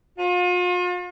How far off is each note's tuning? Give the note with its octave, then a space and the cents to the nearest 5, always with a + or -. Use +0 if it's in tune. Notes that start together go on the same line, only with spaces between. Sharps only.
F4 +40